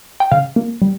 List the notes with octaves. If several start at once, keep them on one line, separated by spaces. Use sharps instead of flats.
G5
C#3 F5
A#3
G3